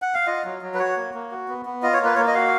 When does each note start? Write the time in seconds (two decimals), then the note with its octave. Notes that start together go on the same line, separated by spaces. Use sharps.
0.02 F#5
0.14 F5
0.27 F4 D#5
0.45 F#3
0.62 F#3
0.74 B4
0.79 F#4 C#5
0.96 A#3
1.14 A#3
1.31 F#4
1.48 B3
1.66 B3
1.83 F4 D#5
1.93 C#5
2.00 A#3 B4
2.16 A#3 C#5
2.27 D#5
2.34 F#4 F5